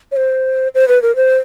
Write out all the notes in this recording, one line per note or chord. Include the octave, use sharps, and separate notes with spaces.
C#5
C5
C5
B4
A#4
C5